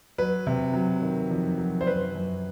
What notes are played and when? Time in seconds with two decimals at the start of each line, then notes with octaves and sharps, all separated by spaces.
0.18 F#3 B4
0.47 C3
0.74 F#3
1.02 D#3
1.31 F2
1.58 F#3
1.81 C5
1.87 F#2 B4
2.15 F#2